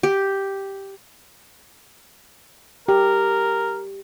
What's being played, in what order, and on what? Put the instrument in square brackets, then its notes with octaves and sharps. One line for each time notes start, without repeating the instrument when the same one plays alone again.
[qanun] G4
[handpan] G4 [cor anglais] A#4